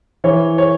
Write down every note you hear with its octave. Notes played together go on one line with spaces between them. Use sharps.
E3 C#5
C#5